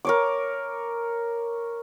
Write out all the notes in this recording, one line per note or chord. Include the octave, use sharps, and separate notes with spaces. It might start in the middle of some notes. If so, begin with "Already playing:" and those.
A#4 C#5 D6